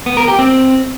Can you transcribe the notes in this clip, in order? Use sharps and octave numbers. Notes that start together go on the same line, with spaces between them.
B3
A#4
G4
C4